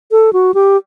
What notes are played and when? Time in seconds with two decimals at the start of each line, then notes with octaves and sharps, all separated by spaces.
0.11 A4
0.33 F#4
0.54 G4